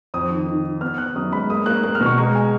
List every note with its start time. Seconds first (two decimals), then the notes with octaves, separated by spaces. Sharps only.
0.14 F2 D#6
0.30 D#3
0.47 D#3
0.64 D#3
0.81 B3 F6
0.98 B3 F#6
1.16 F#2 D#6
1.32 G#3 B5
1.50 A#3 D#6
1.66 A#3 F#6
1.83 A#3 F#6
1.95 F6
2.01 B2
2.06 C#6
2.18 G#3 A#5
2.35 G#5